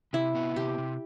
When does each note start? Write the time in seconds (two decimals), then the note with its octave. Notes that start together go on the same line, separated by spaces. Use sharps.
0.13 C3 E4
0.35 B3
0.56 C3 G4
0.78 C3